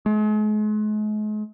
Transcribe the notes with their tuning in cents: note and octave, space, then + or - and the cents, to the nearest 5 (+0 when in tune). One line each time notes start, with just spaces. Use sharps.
G#3 +40